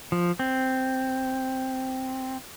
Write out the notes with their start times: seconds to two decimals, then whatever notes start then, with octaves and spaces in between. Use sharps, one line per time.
0.12 F3
0.39 C4